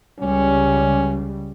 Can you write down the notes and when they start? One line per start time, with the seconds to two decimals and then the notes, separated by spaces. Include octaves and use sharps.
0.19 C#2 C#3 G3 C#4